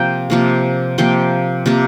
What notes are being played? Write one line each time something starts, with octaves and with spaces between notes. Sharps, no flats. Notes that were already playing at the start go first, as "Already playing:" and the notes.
Already playing: C3 F3 A#3 G5
C3 F3 A#3
C3 F3 A#3 G5
C3 F3 A#3